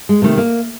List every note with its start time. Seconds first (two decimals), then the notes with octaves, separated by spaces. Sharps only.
0.09 G#3
0.22 C3 D#3 A3
0.37 A#3